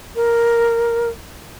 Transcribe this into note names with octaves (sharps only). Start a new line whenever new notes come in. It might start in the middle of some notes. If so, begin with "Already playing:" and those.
A#4